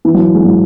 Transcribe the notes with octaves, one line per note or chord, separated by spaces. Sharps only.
E3
F#3
G#3
F#3